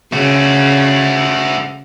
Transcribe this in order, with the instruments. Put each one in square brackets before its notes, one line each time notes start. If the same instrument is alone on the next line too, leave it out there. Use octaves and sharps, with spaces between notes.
[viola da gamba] C#3 [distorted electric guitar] A3 F#4